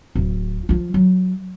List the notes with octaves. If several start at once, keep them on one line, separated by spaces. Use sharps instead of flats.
D1
F3 F4
F#3